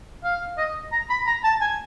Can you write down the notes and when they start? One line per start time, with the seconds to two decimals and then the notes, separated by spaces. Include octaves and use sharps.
0.24 F5
0.58 D#5
0.92 A#5
1.10 B5
1.26 A#5
1.44 A5
1.61 G#5